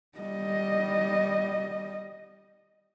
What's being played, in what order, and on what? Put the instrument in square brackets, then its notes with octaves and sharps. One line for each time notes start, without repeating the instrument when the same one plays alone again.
[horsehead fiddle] G3 D#5